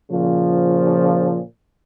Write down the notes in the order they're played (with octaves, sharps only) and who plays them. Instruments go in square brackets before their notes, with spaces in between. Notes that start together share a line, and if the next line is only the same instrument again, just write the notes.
[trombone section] A#2 C#3 F3